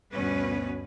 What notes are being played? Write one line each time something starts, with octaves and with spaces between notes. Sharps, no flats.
D2 G2 B2 B3 C#4 B4